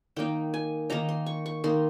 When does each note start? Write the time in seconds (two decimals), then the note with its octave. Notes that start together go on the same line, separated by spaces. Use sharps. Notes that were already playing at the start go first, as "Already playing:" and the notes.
0.16 D#3 A#3 D#4 G5
0.54 G#5
0.90 D#3 A#3 D#4 A#5
1.09 C6
1.26 C#6
1.46 C#6
1.64 D#3 A#3 D#4 C6